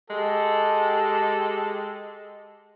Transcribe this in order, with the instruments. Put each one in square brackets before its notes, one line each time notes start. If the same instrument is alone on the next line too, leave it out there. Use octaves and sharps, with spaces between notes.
[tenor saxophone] G#3 [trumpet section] G4 A4